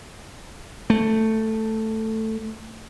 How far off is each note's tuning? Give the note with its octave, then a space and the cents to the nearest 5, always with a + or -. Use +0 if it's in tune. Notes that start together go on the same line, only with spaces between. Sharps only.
A3 +5